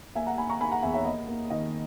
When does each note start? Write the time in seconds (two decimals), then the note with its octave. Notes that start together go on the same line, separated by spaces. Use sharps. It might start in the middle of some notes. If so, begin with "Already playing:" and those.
0.15 A#3 E5 G#5
0.26 F#5 A#5
0.38 A#3 G#5 B5
0.49 A#5 C#6
0.60 A#3 G#5 B5
0.71 F#5 A#5
0.83 E2 E5 G#5
0.94 C#5 E5
1.05 A#3 D#5
1.28 A#3
1.50 D#3 D#5